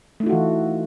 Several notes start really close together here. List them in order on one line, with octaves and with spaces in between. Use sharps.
A3 D#4 F4 F#4 E3